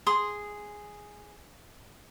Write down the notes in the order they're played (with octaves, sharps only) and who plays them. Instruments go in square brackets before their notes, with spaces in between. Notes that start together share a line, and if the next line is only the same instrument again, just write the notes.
[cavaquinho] G#4 C6 D#6